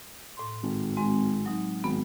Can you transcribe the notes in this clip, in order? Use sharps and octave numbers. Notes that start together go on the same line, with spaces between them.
A2 C6
G#1
G#3 C4 F#4
F#3 D#4
G#1 B3